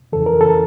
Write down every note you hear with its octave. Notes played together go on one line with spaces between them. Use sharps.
F2 C#3 E3 A4
A#4
A4